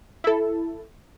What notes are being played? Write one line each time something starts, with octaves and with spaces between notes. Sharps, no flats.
E4 A4